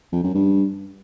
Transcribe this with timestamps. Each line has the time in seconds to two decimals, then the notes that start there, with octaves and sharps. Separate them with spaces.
0.13 F2
0.24 F#2
0.35 G2